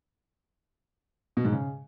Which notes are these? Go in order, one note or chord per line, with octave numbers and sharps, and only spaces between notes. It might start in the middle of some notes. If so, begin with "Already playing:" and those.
B2
G#2
C#3